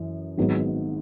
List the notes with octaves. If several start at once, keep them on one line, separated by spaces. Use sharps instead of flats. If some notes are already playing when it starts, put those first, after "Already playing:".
Already playing: F#2 E3
G#1 G#2 F#3 B3